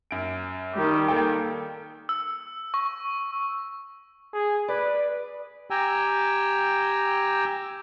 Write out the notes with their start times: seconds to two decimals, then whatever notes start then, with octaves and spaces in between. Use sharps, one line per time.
0.11 F#2 D7
0.74 D#3 G3 G4
1.08 A#3 A4 G5
2.09 E6
2.74 C#6
4.33 G#4
4.68 B4 D5
5.70 G4 G5 G#5 A#5 E6